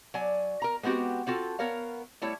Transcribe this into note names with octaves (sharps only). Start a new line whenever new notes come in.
F#3 D5 G#5
A#4 A#5
G#3 B3 C4 F#4 G4
C4 F4 F#4 A4
B3 A#4 C#5 F5
G3 A3 E4 C#5